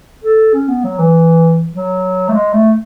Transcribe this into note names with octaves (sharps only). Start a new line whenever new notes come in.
A4
C#4
B3
F#3
E3
F#3
A3
G#3
A3